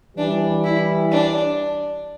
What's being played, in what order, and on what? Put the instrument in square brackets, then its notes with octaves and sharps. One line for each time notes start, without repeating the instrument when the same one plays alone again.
[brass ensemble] E3 G3 [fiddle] D4
[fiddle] E4
D4